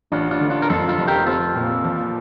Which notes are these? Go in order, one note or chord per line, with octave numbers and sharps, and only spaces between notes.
A1 D4 F4
D4 F4
D3
D4 F4
A#4
F2 F4 A4
F4 A4
F1
G4 A#4
C4 F4 A4
A#2
F3